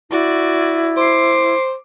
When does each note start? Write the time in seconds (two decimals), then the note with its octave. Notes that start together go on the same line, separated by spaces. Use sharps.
0.11 E4 F#4 D5
0.97 C5 D6 C7